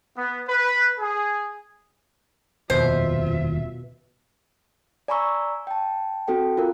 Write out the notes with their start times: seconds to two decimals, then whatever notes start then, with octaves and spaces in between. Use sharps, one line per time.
0.17 B3
0.48 B4
0.99 G#4
2.70 D#1 F2 B2 F4 C5 E5
5.08 D5 G#5 A#5 B5 C#6 E6
5.67 G5 A5
6.28 C4 F#4 A4 F#5 G5
6.57 F4 A#4